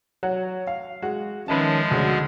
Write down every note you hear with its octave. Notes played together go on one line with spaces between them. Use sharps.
F#3 F#4
F5
G#3 F#4
D#3 F3 G#3 C#4 B4 E5 A5
D2 C#3 F#4